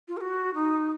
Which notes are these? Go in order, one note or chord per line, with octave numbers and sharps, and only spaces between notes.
F4
A#4
F#4
D#4